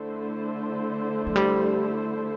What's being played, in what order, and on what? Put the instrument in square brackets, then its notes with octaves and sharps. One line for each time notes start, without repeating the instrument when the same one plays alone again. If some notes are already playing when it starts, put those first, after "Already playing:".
Already playing: [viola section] D3 A3 E4 A4 C5
[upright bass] F3
G3